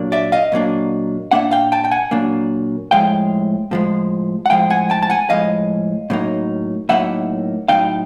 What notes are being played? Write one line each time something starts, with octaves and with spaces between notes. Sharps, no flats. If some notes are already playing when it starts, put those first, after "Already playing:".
Already playing: A#2 F#3 A#3 D4
D5 E5
D#5 F5
A#2 F#3 A#3 D4
A#2 F#3 A#3 D4 E5 F#5
F5 G5
G5 A5
G5
F#5 G#5
A#2 F#3 A#3 D4
A2 F3 G#3 F5 G5
A2 F3 G#3
F#5
A2 F3 G#3 F5 G5
F#5 G#5
G5 A5
A5
F#5 G#5
A2 F3 G#3 D#5 F5
A2 F#3 A#3 D#4
A2 F#3 A#3 D#4 E5 F#5
A2 F#3 A#3 D#4 F5 G5